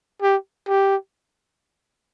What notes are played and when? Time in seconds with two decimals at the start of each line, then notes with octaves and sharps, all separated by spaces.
0.22 G4
0.68 G4